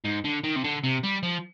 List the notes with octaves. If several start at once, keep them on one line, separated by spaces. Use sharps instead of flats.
G#2
D3
D#3
C3
D3
C3
G3
F3